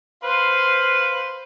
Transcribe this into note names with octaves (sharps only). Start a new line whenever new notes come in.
B4 C5 F5